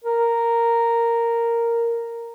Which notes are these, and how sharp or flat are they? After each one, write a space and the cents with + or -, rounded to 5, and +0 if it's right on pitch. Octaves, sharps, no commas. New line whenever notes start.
A#4 -5